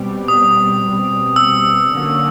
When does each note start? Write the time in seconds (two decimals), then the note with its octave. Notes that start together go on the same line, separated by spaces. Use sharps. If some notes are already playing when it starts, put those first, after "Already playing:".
Already playing: B2 G3 C4
0.28 D#6
0.83 B2 G3 C4
1.36 E6
1.91 D3 F#3 A#3 C#4